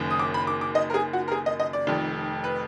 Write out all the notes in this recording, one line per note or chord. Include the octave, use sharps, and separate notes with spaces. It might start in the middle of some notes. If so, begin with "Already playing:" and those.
Already playing: F#1 F#2 D#3
D#6
D6
B5
D6
D6
D#5
A#4
G#4
F#4
A#4
G#4
D#5
D#5
D5
F1 F2 D#3
B4